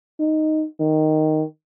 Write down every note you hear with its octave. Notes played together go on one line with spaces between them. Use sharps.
D#4
D#3